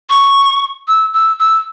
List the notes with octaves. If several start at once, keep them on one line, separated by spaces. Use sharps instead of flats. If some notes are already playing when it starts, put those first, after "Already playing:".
C#6
E6
E6
E6